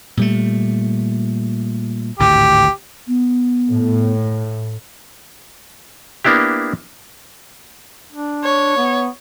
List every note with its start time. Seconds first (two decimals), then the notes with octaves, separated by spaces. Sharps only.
0.17 A#2 G3 A3
2.19 G#1 D2 A2 G4
3.08 B3
3.71 A2
6.25 A#3 B3 D4 E4 G4
8.13 D4
8.44 C#5
8.77 B3